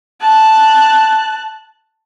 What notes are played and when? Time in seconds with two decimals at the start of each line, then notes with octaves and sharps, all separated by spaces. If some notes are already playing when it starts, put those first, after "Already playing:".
0.21 A5 F#6